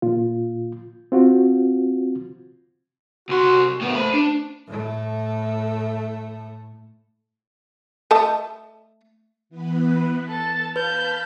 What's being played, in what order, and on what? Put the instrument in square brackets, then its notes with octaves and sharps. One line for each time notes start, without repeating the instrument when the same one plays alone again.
[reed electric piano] A#2 F4
C4 F4 F#4
[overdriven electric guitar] C2 C6 [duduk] F#4
[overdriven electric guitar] A2 B3 [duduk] A3
[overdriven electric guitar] C5 B5
D4
[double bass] A2 A3
[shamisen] A3 D#5 A5
[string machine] E3 B3 B4
[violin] A4 A6 [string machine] A5
[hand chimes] B4 [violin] F5 G6 [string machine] A5 B5 F6